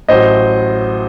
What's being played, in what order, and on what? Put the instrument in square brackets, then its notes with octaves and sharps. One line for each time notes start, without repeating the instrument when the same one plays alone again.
[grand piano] A1 A2 F#3 C5 D#5